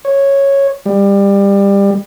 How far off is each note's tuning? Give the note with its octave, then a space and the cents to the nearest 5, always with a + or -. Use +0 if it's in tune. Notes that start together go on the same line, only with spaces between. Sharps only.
C#5 -5
G3 +25